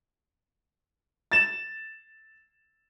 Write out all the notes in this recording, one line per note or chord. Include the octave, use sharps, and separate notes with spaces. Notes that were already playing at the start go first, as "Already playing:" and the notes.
A6 E7